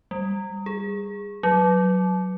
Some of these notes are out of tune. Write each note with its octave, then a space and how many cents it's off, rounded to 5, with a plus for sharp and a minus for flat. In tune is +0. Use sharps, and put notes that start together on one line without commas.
G3 +10
G#4 -20
F#3 +0